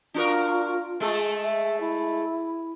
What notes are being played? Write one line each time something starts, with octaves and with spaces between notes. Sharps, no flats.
D4 F4 F#4 A#4
G#3 A3 A4
E5
E4